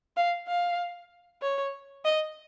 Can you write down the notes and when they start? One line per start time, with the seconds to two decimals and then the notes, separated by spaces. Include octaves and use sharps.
0.16 F5
0.48 F5
1.42 C#5
2.05 D#5